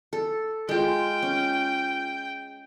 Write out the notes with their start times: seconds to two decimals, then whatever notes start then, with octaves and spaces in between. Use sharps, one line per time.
0.13 A4
0.69 G#3 F4 G5
1.23 C#4